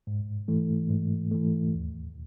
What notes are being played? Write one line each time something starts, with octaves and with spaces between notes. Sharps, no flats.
G#2
E3 A3
G#2
E3 A3
D#2